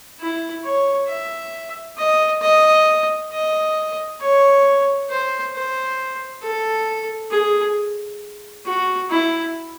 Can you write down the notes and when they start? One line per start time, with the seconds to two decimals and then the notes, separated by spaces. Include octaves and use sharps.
0.20 E4
0.64 C#5
1.08 E5
1.98 D#5
2.42 D#5
3.32 D#5
4.21 C#5
5.10 C5
5.54 C5
6.43 A4
7.32 G#4
8.66 F#4
9.10 E4